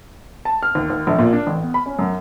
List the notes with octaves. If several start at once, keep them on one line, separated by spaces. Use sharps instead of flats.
A5
F6
D#2
D#2
A#1
A#2
D4
A1
B3
B5
C#4
F#2